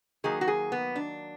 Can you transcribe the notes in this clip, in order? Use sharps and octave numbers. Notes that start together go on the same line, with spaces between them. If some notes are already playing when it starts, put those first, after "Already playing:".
D#3 F#3 A#3 G#4
F#4
G#4
B3
D4